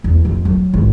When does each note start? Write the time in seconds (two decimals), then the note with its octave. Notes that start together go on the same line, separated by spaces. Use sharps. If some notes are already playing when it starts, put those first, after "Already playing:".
0.04 E2
0.25 F2
0.45 F#3
0.74 G#1